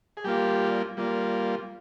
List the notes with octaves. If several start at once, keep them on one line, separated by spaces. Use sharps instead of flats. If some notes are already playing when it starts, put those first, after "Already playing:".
G#4
G3 A#3 F4 G4
G3 A#3 F4